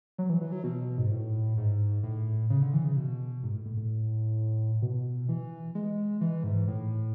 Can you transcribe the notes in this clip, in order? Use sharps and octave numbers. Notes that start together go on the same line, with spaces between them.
F#3
E3
E3
F#3
B2
G#2
A2
G#2
A2
C#3
D3
E3
C#3
B2
G#2
A2
A2
A2
B2
E3
G#3
E3
G#2
A2